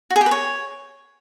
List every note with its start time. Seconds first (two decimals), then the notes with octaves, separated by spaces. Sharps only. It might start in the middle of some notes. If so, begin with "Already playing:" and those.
0.10 F#4
0.16 G#4
0.21 G4
0.26 B4
0.31 C#5